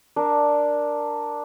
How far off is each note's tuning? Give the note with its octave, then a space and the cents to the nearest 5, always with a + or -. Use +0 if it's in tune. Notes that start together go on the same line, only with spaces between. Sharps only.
D4 +0 A#4 +0